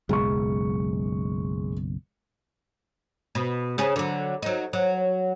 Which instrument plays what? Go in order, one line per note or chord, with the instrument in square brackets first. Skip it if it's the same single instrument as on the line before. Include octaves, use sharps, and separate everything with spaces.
[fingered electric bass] F#1 B1 [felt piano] G#3 C#6
[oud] B2
C#3 C#4 G#4
D3 F#3
F#3 D#4
F#3